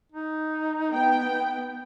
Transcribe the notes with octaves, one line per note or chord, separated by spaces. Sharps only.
D#4
B3 G5